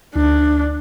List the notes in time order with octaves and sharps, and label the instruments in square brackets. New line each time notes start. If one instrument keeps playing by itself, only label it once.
[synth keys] D2 [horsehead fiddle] D4